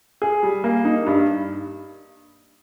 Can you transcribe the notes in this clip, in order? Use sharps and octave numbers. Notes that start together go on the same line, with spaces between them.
G#4
G3
A#3
D#4
G2